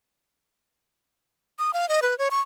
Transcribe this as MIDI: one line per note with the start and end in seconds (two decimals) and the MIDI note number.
1.59 1.71 87
1.73 1.89 77
1.89 2.00 75
2.02 2.17 71
2.18 2.29 73
2.31 2.41 85